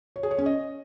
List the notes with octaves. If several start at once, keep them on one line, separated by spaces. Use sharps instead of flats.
C#5
G#4
C#5
C#4
D#5